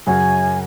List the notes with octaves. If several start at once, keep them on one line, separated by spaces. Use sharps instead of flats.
F#2 C#3 F#3 C#4 F#4 G#5